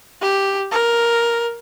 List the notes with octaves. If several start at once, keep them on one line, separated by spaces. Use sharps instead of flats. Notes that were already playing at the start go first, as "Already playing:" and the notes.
G4
A#4